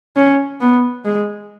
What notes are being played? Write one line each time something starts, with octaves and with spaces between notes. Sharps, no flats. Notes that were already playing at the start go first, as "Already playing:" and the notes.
C#4
B3
G#3